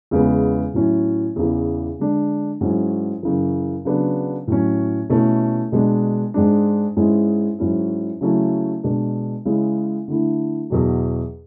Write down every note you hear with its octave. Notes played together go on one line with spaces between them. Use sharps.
E2 C#3 G#3 B3
A2 F#3 C#4 E4
E2 C#3 E3
D3 G#3 D4
G#2 F#3 C#4 E4
F#2 C#3 E3
C#3 F#3 B3 D4
A2 F#3 C#4
B2 A3 C#4 E4
B2 G#3 D4
G#2 G#3 D4
G#2 G#3 C#4 E4
G#2 F#3 C#4 E4
C#3 F#3 A3 C#4 E4
B2 G#3 D4
C#3 G#3 C#4 E4
D3 A3 E4
E2 B2 F#3